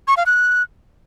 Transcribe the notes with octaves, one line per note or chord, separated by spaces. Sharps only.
C#6
F5
F#6